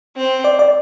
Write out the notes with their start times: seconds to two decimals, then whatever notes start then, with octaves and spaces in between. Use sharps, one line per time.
0.16 C4
0.44 D5
0.59 D5